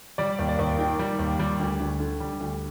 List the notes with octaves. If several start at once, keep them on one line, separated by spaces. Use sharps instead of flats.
G3 D5
D#2
D5
D#2
D#3 G5
G3
D#2
G3
D2
D2
D3
G3
D2